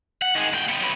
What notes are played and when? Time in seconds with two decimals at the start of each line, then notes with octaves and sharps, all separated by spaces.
0.22 F#5
0.35 D#3 G#4
0.53 D2 G5
0.69 B3 G5
0.81 F#3 B3